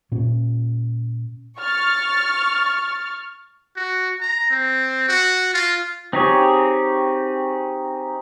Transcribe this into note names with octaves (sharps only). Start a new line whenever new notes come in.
A#2 C#4
C#6 F6 A6
F#4
A#5
C4
F#4
F4
C4 D#4 G4 G#4 C#5